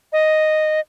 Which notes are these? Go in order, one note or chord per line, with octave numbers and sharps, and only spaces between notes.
D#5